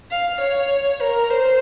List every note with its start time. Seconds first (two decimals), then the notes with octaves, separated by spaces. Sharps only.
0.11 F5
0.40 C#5
1.00 A#4
1.30 C5